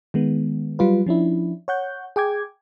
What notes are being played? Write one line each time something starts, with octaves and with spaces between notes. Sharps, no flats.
D#3 G#3 B3
F#3 G3 F4 B4
F3 C#4 D4 E4
C#5 F#5 G6
G#4 G5 D6 G#6